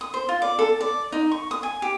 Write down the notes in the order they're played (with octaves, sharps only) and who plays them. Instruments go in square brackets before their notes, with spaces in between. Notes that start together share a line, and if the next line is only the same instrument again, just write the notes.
[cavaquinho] D#6
C5
F4
D5
A4
D5
D#4
C#6
D#6
G#5
G4